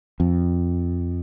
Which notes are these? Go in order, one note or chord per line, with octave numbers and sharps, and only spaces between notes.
F2